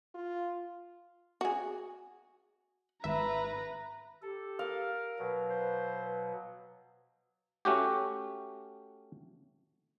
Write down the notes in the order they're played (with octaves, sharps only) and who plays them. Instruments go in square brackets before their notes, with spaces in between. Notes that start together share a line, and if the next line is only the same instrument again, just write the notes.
[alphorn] F4
[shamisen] F#4 G#4
[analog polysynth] G#1 E5 [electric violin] B4 A#5
[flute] G4 [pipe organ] A4
[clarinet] A#4 [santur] F5
[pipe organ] B2 F#3 [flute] B4
[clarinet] C5
[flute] B4
[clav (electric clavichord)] A3 C#4 F#4 G4